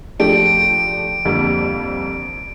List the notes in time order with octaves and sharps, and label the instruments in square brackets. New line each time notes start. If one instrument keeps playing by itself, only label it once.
[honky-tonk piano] F3 A3 D4 G4 [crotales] D7
[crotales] D7
D7
D7
[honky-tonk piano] F2 D3 G3 A#3